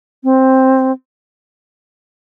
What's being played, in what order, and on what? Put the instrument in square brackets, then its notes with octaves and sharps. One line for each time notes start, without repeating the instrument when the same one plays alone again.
[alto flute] C4